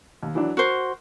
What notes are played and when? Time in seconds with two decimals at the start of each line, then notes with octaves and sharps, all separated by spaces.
0.23 D#2
0.35 E3 F#3 D4
0.57 F#4 A#4 C5